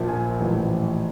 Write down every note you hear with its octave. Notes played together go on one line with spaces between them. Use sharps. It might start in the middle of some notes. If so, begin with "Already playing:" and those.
Already playing: A#1 A#2 F3
G#5
A1 A2 F3